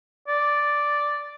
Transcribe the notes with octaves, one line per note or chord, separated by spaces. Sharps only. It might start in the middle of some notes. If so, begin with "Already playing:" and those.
D5